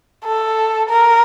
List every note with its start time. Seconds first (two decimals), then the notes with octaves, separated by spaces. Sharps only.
0.25 A4
0.89 A#4